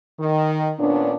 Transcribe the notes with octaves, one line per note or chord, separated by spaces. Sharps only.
D#3
A#2 B3 C#4 D4